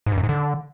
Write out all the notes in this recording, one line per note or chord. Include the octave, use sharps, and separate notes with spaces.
G#2
G2
F#2
G#2
D3